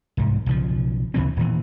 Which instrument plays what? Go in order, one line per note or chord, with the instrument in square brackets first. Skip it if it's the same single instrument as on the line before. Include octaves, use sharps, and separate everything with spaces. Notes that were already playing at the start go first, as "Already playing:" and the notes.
[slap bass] C2 G#2
B1 C#3 F3
D#2 C#3 E3 C4
D#1 A#2 E3